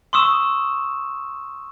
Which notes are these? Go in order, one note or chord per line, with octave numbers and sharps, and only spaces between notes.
C6 C#6 D#6 E6 E7